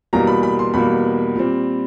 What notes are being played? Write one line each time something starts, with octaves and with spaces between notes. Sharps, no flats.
E2 B2 G3 A#3 A#5
B5
B5
C6
E2 B2 G3 A#3 B5
A#2 G3 C4